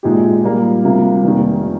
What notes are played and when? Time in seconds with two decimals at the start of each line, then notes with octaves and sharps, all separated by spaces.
0.03 A#1 A#2 G#3 D#4 G4
0.44 A#2 G3 A#3
0.84 D2 C3 G3 A#3 F4
1.24 F1 D#2 D#3